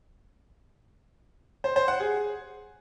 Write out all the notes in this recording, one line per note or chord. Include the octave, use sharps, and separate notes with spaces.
C5
C5
F#5
G#4